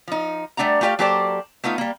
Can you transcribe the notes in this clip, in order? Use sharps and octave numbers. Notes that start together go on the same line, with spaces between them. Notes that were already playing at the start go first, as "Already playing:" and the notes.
F3 D#4
G3 A3 D4 F#5 A#5
A3 F4 G4 B4 D5 F5
F#3 A#3 G4 A4 C5 D5
A3 B3 D#4 F4
G3 A#3